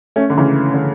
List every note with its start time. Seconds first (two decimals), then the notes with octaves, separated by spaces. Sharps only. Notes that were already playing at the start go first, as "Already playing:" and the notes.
0.16 A3 C#4
0.30 D3
0.38 C#3 E3
0.74 D3